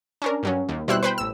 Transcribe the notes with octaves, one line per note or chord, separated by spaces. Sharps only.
C#4 D4 A#4
G2 F#3 C#4
D#2
B2 G3 E4 C5 E6 F#6
B4 C5 G5 B5
A1 E6